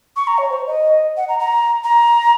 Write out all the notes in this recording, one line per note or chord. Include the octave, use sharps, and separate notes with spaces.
C#6
A#5
C#5
C5
D#5
F#5
A#5
A#5
A#5